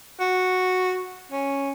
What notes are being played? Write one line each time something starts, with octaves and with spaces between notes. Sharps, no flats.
F#4
C#4